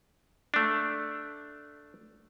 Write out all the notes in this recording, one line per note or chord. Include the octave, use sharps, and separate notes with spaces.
A3 D4